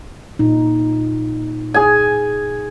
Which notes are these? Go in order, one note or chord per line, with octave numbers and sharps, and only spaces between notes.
A#2 D#4
G#4 G#5